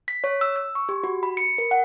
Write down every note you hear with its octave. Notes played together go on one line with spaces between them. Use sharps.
B6
C#5
E6
E6
C#6
G4
F#4
B5
C#7
A#4
F#5